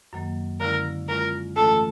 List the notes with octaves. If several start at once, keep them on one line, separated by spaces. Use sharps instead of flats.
F#2 D#3 F#3 A#3
D3 F3 G#3 C#4 E4 A#4
F3 G#3 C#4 F4 A#4
G#2 E3 A3 C#4 F4 A4